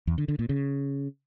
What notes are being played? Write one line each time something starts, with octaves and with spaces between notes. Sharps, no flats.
E2
D3
D3
A#2
C#3